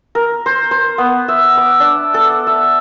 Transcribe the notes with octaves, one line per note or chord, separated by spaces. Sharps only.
A#4
C5
C5
B3
E5
D6
D4
A4
E5